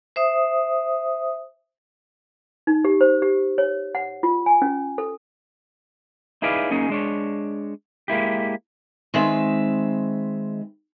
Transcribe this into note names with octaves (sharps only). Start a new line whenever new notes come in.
C5 E5 D#6
D#4
G4
C5
G4
C#5
F#5
F4
G#5
C#4
A4
D#4 E4 G#4 B4 D5 F5
F#3 A#3 C#4 D#4 G#4
G#3 D4 C#5
G#3 A#3 E4 G4
D#3 G#3 C4 B4 E5